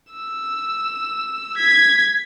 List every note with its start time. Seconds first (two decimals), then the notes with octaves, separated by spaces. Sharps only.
0.12 E6
1.57 G#6 B6